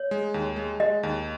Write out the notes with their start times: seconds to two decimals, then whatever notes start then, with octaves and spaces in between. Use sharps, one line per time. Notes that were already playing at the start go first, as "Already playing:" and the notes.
Already playing: C#5
0.11 G#3
0.34 D#2
0.56 G#3
0.80 G#3 D#5
1.03 D#2